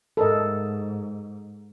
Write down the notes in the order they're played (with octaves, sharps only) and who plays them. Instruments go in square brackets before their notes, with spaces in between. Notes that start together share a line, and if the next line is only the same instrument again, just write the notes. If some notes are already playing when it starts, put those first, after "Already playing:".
[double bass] G#2 [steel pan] A4 A#4 D#5